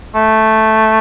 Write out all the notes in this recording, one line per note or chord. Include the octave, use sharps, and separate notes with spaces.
A3